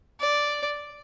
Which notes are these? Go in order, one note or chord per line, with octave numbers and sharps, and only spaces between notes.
D5